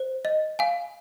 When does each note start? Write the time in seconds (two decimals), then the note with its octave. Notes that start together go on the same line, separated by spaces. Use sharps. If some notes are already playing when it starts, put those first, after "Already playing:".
Already playing: C5
0.25 D#5
0.59 F5 G#5